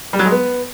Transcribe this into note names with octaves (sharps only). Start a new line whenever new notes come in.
G3
F#3
G#3
B3